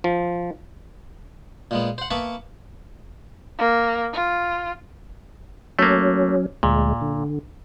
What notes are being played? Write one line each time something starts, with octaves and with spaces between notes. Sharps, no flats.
F3
A#2 G#3 B3
C5 F#5
A#3 B3 B4 E5 A5 C#6
A#3
F4
F#3 A3 A#3 C#4
D2 A#2 G#3
D3